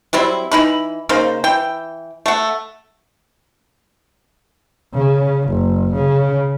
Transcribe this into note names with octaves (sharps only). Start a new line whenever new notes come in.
F#3 G3 C4 E4
E3 D#4 B5
C#3 A#3 D#4 C5
E3 G5
A3 F#5
C#3
F#1
C#3